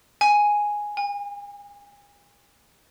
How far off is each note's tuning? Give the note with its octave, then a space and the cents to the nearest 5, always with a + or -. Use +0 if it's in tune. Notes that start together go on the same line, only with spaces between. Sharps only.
G#5 +0
G#5 -40